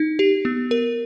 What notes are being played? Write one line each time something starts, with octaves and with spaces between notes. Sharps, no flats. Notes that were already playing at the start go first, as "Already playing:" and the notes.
Already playing: D#4
G4
B3
A#4